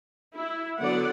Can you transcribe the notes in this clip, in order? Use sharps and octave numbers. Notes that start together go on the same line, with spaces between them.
E4
D3 F#3 B3 D5 F#5